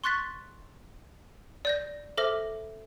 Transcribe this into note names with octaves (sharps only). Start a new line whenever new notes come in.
C6 C#6 F#6 A6 B6
D5 G6 A#6
A4 C5 E5 D6 F6 A#6